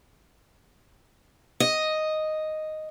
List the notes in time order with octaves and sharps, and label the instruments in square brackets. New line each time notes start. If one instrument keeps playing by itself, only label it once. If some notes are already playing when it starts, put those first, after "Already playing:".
[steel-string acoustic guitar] D#5